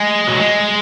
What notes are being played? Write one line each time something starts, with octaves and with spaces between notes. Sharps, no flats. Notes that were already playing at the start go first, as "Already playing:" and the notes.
Already playing: G#3
F#3
G#3